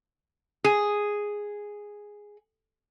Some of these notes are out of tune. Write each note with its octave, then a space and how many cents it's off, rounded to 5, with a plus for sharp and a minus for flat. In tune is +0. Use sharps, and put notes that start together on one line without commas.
G#4 -5